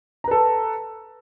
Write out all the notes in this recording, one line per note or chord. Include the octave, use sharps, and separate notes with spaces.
A4 B4 A#5